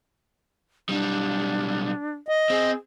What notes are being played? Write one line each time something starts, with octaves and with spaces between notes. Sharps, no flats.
B1 G3 D4
D#5
C4 G#4